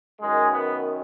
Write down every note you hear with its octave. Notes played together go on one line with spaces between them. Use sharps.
F#2 D#3 G#3
B3